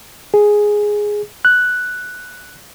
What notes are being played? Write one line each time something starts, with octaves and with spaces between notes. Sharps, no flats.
G#4
F#6